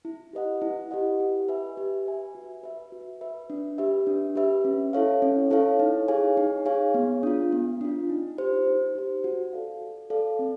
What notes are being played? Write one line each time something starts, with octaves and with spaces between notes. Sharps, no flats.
E4
G4 B4 D#5 F#5
E4
G4 B4 D#5 F#5
G4
B4 E5 G#5
G4
B4 E5 G#5
F#4
B4 E5
F#4
B4 E5
D4
G4 B4 E5
D4
G4 B4 E5
C#4
E4 A4 C#5 F5
C#4
E4 A4 C#5 F5
D#4
G#4 C#5 F5 G#5
D#4
G#4 C#5 F5 G#5
B3
D4 F4
B3
D4 F4
D#4
G4 C5
D#4
G4 C5
F#4
A4 D5 F5
F#4
A4 D5 F5
C4